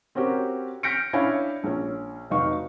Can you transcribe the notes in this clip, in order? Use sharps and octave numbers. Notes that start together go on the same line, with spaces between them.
C4 C#4 F#4 G4 A#4
F6 G6 A#6 B6 C#7 D7
C#4 D4 E4 F5 G#5
A#1 C#4
F1 F#3 D#4 F5 C#6